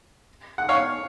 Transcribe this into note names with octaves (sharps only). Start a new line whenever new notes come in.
F#5
C#5 F5